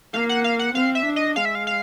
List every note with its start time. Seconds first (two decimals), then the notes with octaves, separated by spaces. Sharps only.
0.13 A#3 F5
0.29 F#5
0.44 F5
0.59 F#5
0.75 C4 F5
0.95 E5
1.06 D4
1.16 D#5
1.36 G#3 F5
1.45 E5
1.55 F5
1.67 F5